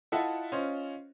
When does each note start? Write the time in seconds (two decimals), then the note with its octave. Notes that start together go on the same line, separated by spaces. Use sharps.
0.12 E4 F4 A4 D#5 E5 F#5
0.52 C#4 F4 C5 D#5